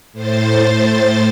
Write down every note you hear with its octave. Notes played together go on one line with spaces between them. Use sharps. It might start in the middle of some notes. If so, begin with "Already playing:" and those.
A2 C5 A6